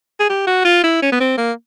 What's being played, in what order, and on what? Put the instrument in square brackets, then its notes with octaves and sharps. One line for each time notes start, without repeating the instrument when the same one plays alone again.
[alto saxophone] G#4
G4
F#4
F4
E4
C#4
B3
C4
A#3